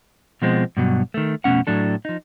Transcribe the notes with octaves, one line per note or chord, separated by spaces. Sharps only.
B2 F3 G#3 C4
G2 B2 F#3
D#3 A3
F2 B2 A3 C#4 F#5
A2 F#3 D4 A4
F3 D#4